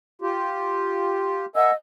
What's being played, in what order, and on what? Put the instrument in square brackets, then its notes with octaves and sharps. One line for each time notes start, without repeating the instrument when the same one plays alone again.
[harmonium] F4 G4
[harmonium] A#4 E5 G#5 [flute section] D#5 F#5 E6